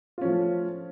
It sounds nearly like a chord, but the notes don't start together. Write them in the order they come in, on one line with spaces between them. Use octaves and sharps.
F4 C#4 F3 A3